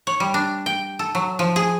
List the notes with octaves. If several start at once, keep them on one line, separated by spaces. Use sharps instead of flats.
C#5
G3
D4
G5
A4
F#3
F3
G#4